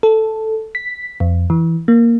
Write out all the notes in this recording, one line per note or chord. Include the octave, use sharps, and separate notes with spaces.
A4
B6
F2
E3
A#3